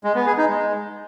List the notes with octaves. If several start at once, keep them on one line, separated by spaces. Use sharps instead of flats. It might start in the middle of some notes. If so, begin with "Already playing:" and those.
G#3
B3
G#4
D#4
G#3